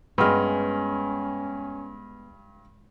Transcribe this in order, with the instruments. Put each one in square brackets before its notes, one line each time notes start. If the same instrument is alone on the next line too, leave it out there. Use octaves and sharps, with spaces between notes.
[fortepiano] G2 F6 [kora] G#3 B3 [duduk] C#4